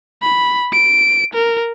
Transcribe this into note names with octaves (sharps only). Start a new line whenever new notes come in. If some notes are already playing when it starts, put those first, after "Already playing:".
B5
D7
A#4